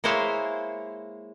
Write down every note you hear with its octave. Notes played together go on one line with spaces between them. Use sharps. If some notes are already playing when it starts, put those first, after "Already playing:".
G#3 A#3 E4 C5 C#5 F5